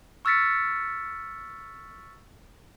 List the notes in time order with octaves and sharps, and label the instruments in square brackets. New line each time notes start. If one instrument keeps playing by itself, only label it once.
[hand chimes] C#6 E6 F6 A6 B6 C#7